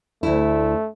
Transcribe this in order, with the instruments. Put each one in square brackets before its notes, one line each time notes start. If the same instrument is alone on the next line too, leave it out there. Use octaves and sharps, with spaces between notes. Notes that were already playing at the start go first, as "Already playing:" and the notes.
[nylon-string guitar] D2 E4 [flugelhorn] A3